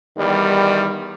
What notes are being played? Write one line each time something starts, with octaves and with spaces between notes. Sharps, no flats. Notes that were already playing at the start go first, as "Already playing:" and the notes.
E2 D#3 G3